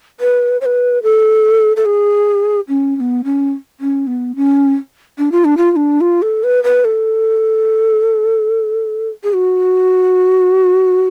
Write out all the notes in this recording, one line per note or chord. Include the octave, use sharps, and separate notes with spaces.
B4
C#5
B4
A4
A4
G#4
C#4
C#4
B3
C#4
C#4
B3
C#4
D4
F4
D4
F4
F4
D4
F4
A4
B4
B4
A4
G#4
F#4